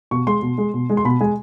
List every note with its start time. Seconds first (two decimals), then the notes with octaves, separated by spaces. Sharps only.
0.11 B2 C#6
0.27 G#3 C6
0.42 B2
0.58 G#3
0.74 B2
0.90 G#3
0.97 C6
1.05 B2 B5
1.21 G#3 G#5